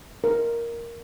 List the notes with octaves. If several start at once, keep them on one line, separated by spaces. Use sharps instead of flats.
A#4